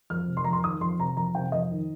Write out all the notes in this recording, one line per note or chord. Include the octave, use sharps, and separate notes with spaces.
F2 F6
C3
C6
F2 A#5
C6
D#3 D#6
F2 C6
C3 A#5
F2 A#5
C3 G5
F2 D#5
D#3